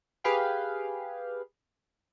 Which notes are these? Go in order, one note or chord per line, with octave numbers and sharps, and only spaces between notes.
G4 G#4 B4 F5 G5